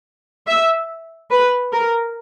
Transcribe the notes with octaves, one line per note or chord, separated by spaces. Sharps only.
E5
B4
A#4